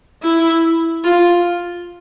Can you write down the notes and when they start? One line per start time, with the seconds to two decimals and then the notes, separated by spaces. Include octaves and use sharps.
0.23 E4
1.04 F4